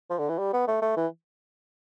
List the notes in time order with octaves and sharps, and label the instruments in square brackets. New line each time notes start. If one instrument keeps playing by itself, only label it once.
[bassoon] F3
D3
E3
G3
B3
A3
A3
E3